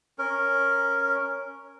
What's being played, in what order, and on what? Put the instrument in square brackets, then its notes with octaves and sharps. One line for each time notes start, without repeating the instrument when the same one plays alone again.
[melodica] C#4 A#4